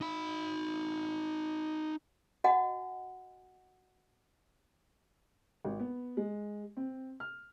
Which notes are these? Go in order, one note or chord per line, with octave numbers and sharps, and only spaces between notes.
D#4 B5
F#4 D#5 F#5 G#5
G#1
B3
G#3
C4
F6